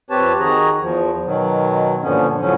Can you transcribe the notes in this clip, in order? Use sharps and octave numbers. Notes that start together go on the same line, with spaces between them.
F2 C4 G4 B4 C#5 A5
D#3 F#4 G#4 A#5
E2 F3
B2 D#3 F#3
G2 A#2 D3 F3 B3 C#4
A2 D3 F3 F#3 C#4